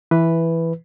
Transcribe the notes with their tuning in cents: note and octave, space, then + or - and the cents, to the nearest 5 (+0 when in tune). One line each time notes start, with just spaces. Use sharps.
E3 +0 B4 +0